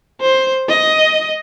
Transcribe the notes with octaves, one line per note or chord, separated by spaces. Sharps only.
C5
D#5